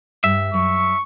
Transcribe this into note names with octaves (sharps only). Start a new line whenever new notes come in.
G2 E5
F#2 C#6